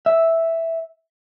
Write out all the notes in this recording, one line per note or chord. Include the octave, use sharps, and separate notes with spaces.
E5